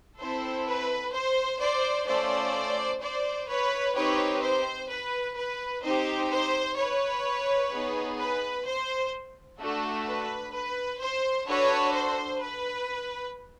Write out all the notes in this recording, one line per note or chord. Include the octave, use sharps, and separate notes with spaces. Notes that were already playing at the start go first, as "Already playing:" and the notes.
C4 E4 A4 C5
B4
C5
C5 D5
A3 C#4 F4 C5 D5
C5 D5
B4 C#5
C4 D#4 G4 B4 C#5
C5
B4
B4
C4 D#4 G4 C5
C5
B4 C#5
B3 D#4 G#4
B4
C5
A3 D4 F#4 A4
B4
B4
C5
D4 F#4 A4 B4 C#5
C5
B4